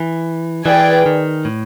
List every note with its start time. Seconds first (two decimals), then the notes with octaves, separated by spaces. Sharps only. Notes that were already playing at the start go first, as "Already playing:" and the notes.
Already playing: E3
0.66 E3 G#4 B4 D5 G5
1.06 D#3
1.45 A2